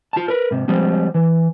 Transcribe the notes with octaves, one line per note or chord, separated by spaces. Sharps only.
F4 A5
A#4 B4
G#2 C3
F3 G3 G#3 C4
E3